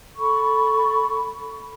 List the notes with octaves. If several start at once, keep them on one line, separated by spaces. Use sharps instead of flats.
A4 B5 C#6